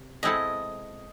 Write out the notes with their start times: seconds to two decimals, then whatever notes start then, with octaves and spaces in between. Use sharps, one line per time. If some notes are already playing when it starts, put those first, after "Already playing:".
Already playing: C3
0.23 B2 G#3 C4 E4 A4 D#5